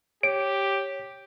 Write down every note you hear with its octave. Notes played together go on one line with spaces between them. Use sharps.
G4 C#5 D7